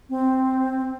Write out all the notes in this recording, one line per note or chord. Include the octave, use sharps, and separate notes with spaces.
C4